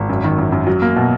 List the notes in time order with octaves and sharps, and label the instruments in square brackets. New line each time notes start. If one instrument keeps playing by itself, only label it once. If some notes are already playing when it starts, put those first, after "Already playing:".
Already playing: [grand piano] G#1
F#2
D#3
F#2
F#2
F#3
A#3
B2